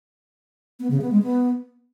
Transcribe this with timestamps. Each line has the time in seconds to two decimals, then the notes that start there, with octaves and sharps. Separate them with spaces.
0.80 B3
0.91 C#3
1.01 B3
1.12 G#3
1.23 B3